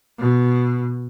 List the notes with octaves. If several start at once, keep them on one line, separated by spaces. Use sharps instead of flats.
B2